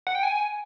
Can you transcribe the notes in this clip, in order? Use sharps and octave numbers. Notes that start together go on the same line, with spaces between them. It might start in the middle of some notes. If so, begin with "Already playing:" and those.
F#5
G5
G#5